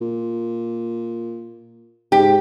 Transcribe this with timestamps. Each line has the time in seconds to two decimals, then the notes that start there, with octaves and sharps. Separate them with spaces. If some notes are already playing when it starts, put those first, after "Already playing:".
0.01 A#2
2.12 G#2 G4